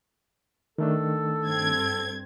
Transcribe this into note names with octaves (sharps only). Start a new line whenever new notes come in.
D#3 A3 D4 A4
G2 C4 G#6